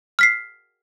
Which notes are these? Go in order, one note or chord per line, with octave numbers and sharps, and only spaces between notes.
F6 B6 C7